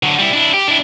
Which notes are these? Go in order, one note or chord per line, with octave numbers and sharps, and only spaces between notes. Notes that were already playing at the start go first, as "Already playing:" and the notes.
D3 F#3
G3 E4
D4 E4
G4
D4 E4